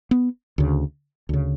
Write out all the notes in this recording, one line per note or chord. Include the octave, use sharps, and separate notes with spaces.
B3
D2 C#3
D2 C#3